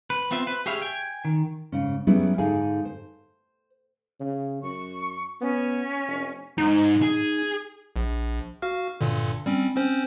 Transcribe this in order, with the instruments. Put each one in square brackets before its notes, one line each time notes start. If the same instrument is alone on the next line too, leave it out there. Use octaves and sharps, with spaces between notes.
[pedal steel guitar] B4
B3 C4 F4 E5
B4
G4 G#4 C#5 E5 F5
G5 G#5
D#3
[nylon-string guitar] G#2 C#3 C#4
F#3 G3 B3 C#4 E4 G#4
G#2 D3 D#4 G#4 F5 G#5
C5
[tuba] C#3
[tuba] F#2 [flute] C#6
[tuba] B3 [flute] C#4
[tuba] F1
[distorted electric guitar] G#2 [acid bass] D#4
[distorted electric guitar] G#4
[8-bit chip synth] A#1
F#4 F5 F6
G2 A#2 D3
G3 C4 C#4
C4 C#4 C5